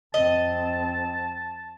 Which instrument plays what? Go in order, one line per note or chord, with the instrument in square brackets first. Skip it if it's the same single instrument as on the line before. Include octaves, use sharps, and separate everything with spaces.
[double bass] F2 C4 [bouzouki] D#5 [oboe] A5